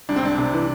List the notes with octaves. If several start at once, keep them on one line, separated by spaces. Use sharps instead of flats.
C2 D4
C4
C2 D4
C3
E3